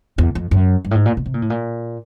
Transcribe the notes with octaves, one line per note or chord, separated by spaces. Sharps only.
E2
F2
F#2
G2
A2
G#2
A#2
B2
C3
A#2
A2
A#2